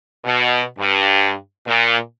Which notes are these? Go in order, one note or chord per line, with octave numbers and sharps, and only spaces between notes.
B2
G2
A#2